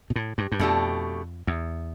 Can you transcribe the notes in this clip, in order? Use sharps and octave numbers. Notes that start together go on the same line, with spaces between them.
B2
A2
G2
G2
F2 B2 A3 D4 G4
E2